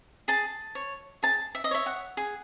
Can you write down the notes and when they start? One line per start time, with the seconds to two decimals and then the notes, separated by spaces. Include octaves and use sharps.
0.28 G#4 A5
0.75 C#5
1.23 G#4 A5
1.55 E5
1.64 D#5
1.71 C#5 E5
1.86 F#5
2.17 G#4